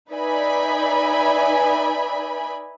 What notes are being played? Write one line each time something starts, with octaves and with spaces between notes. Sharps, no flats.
D#4 B4 D5 E5 G#5 B5